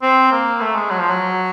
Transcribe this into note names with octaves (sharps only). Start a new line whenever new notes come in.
C4
A#3
A3
G#3
F#3
F3
F#3